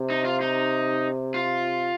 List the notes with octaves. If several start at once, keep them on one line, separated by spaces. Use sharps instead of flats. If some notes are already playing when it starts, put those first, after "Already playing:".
Already playing: C3
D#4
F4
D#4
F4